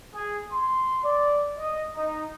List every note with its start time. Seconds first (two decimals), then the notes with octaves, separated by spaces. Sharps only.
0.15 G#4
0.53 C6
1.04 D5
1.58 D#5
1.95 D#4